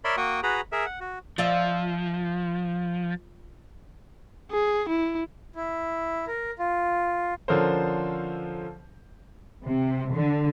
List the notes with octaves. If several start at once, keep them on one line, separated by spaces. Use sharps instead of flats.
A#4 C#5 D5 E5 B5 C6
A#3 F#4 G5 C#6 D#6
F#4 G#4 B4 A#5 B5
G#4 A#4 E5
F#5
F#4
F3 F4 D5 E5
G#4
E4
E4
A#4
F4
D3 F3 C#4 A4 A#4 C5
C3
D3